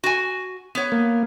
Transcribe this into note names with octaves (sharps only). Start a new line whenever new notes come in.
F#4 G#5
B3 C#5
A#3